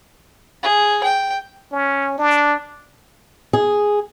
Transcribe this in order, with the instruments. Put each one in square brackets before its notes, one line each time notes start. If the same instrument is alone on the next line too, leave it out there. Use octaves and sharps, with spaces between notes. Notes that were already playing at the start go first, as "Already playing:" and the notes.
[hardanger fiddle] G#4
G5
[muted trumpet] C#4
D4
[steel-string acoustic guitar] G#4